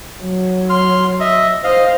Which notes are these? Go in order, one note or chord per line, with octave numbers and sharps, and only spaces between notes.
F#3
C6 F6
D#5 E5
C5 D#5 F5